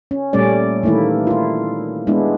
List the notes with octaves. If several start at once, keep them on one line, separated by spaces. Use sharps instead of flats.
C#4
A#2 G3 A3 C#4 D5
D#3 E3 A3 A#3 E4
E4 F4
G#3 B3 D4 E4